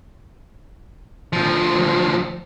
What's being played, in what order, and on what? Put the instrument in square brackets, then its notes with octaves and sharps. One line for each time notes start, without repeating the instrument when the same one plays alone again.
[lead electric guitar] D2 F3